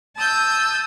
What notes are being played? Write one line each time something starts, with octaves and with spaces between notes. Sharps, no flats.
A5 D#6 E6 G6